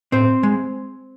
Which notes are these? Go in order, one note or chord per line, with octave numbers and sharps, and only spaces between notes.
A2 C4 C5
G#3